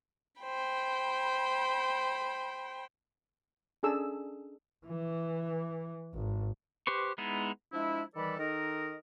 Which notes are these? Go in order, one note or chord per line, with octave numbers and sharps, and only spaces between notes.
C5 G5 B5
C#4 D4 G#4 A4 E6
E3
G#1
G4 B4 C5 C#6
G#3 B3 D#4 E4
F3 G#3 D4 E4
D#3 E3 G3 A4 D5 B5
D#3 D#4 A4 A#4 D#5